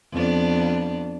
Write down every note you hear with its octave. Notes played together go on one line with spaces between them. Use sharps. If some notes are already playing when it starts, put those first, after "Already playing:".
F2 B3 D4